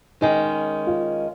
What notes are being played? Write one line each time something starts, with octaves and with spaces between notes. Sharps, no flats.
D#3 G#3 C#4 D#4
F4